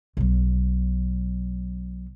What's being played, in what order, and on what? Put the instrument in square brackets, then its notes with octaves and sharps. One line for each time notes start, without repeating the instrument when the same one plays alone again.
[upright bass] B1 F#3